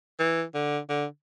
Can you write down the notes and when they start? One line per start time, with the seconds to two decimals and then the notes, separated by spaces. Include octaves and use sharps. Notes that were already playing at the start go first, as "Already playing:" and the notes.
0.19 E3
0.54 D3
0.89 D3